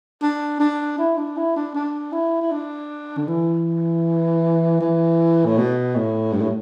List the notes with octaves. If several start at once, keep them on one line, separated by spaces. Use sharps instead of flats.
D4
D4
E4
D4
E4
D4
D4
E4
E4
D4
D3
E3
E3
A2
B2
A2
G2
A2